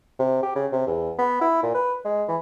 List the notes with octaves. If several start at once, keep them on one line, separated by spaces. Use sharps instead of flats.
C3
G4
C#3
C3
E2
B3
E4
A#2
B4
G#3
E3